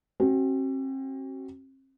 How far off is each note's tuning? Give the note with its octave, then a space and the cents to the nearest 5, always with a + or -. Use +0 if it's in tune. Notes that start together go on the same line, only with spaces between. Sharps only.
C4 +40 F#4 +30